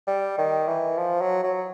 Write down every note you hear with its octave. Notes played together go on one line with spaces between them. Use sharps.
G3
D#3
E3
F3
F#3
F#3